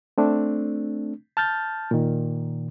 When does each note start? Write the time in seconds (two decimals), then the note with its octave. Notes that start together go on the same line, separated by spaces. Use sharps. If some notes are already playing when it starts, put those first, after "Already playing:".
0.18 A3 C4 D4
1.37 A5 F6 G6 A6
1.91 A#2 D#3